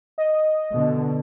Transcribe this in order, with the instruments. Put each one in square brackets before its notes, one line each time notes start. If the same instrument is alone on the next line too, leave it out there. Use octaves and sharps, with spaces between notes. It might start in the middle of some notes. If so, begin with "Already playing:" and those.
[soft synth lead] D#5
[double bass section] B2 D3